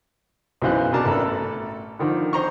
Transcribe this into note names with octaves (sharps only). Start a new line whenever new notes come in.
B1 F#2 E3 C5 F5 F#6
B2 D4 A#4 A5 A#5
A1 B3 A4 B4
D3 D#3 F3
C5 A#5 C#6